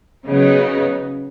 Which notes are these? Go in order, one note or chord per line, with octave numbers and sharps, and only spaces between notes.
C#3 F#3 B3 D#4